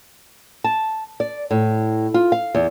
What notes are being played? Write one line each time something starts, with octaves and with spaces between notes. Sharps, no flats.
A5
D5
A2
F4
F5
E2